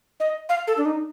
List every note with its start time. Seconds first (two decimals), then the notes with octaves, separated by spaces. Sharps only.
0.20 D#5
0.49 F5
0.67 A4
0.78 D4
0.85 D#4